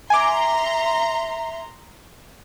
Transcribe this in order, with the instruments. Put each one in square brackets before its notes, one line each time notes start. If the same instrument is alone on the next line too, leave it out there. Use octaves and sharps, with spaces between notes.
[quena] E5 [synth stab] G#5 D6 [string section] A#5 C6